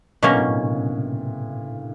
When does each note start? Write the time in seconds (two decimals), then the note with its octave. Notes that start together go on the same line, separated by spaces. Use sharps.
0.23 G2 B2 F#3 A#3 C#4
0.33 A2
0.42 A#2
0.53 C3
0.63 C#3